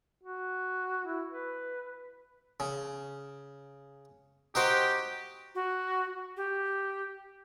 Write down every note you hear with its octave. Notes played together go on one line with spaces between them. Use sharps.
F#4
E4
B4
C#3
D#4 F#4 G4 C5
F#4
G4